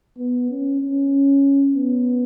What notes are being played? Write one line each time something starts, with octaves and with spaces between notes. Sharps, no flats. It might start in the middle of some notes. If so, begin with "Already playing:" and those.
B3
C#4
C#4
B3